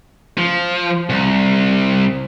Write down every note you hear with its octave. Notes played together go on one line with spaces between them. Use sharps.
F3
C2